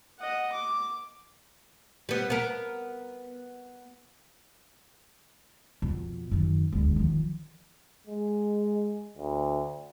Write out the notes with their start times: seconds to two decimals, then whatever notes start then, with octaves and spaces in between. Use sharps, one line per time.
0.19 D#5 F#5
0.52 D6
2.09 G3 B3
2.30 B3 A#4
5.82 F2 B2
6.31 F#2 D#3
6.72 E1 D2
6.96 D#3 F3
8.07 G#3
9.18 D2